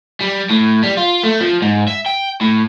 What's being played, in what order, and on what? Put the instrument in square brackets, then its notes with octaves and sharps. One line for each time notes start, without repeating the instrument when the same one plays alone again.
[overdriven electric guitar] G3
A2
G3
F4
A3
F3
G#2
E5
G5
A2